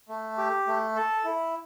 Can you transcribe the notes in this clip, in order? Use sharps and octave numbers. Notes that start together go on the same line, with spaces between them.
A3
G4
A3
A4
E4